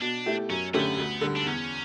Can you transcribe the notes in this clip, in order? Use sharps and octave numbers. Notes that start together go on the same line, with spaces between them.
B2 D4
A3 E4 G4
F#2 C#4
D3 A3 B3 C#4 G4
D2
D3 G3
D4
E2 C#4